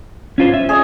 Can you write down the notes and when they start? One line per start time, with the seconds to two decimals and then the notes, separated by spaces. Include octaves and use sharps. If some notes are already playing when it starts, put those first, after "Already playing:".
0.38 C#4 F4 C5
0.54 E5
0.69 G#4 C#5 D#5